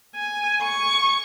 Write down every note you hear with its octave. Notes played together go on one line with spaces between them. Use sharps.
G#5
C#6